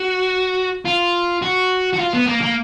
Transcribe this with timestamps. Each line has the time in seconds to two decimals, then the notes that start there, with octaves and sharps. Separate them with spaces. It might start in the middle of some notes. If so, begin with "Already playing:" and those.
Already playing: F#4
0.85 F4
1.42 F#4
1.93 F#4
1.99 F4
2.13 B3
2.26 A#3
2.41 A#3